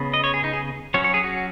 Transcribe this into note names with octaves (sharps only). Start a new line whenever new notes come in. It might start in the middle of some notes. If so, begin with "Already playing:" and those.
Already playing: C#3 B3
D#5
C#5
G#4
D#4
G#4
F#3 C#4 C#5
C#5
G#4
F#4